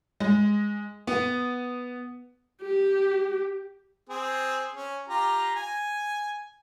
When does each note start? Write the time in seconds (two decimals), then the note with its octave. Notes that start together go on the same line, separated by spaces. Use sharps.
0.20 G#3
1.07 B3
2.62 G4
4.09 C4 G#4
4.73 C#4
5.08 F4 G4 A#5
5.55 G#5